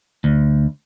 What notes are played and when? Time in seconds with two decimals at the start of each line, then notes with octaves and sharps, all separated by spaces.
0.24 D2